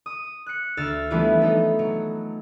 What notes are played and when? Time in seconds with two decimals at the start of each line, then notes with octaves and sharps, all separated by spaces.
0.06 D#6
0.46 F#6 C#7
0.77 D2 E6 F6 A6
1.11 E3 F3 G3 A3 B3 E4
1.42 D#4 A4
1.79 F#3